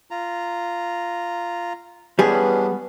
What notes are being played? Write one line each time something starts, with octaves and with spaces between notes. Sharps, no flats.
F4 A#5
E3 G3 B3 C#4 D4 G#4